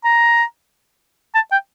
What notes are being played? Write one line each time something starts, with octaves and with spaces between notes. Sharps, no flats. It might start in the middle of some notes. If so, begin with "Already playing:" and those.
A#5
A5
G5